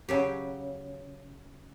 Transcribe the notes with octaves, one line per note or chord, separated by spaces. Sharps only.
C#3 F#3 G4